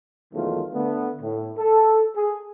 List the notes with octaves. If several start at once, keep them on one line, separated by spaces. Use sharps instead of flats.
B1 E2 D#3 G#3 A3 F4
D3 A3 B3
A2
A4
G#4